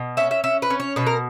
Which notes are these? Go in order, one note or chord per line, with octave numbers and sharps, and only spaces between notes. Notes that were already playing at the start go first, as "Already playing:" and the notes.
Already playing: B2
C#4 E5
E5
C#4 E5
B4
C#4
C#5
B2 B4
A#4